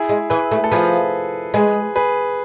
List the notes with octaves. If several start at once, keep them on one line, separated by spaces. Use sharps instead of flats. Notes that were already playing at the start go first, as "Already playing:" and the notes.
Already playing: E4 G#4
G#3
E3 G#4 B4
A3
A4
F3 G#4 B4
G#3 G#4 B4
G#4 B4